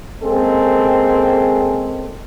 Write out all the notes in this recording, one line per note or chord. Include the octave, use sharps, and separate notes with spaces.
G#3 A#3 C4 C#4 G#4 A4